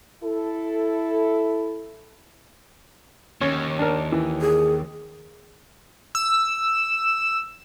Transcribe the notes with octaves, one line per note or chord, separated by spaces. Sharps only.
E4 A4
D#2 C#4
D4 A#4
E3
G#4
E6